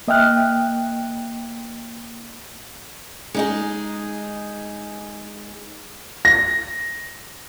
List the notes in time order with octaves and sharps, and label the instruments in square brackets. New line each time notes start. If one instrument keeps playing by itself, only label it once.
[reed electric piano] A#3 D#5 E5 G5 F6 F#6
[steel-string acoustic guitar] G#3 D#4 G#4
[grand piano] A#6